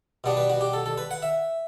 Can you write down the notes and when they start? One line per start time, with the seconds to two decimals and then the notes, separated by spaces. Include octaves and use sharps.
0.24 B2 G3 B3 D4
0.37 B4
0.50 F#4
0.61 G4
0.73 A4
0.86 A4
0.98 B4
1.11 F#5
1.22 E5